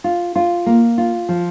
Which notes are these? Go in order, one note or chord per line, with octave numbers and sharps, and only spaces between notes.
F4
F4
A#3
F4
F3